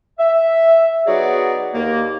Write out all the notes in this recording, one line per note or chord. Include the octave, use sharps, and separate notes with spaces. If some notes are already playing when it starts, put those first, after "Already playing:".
E5
F#3 B3 D#4 F#4 G#4 D5
D#2 A#3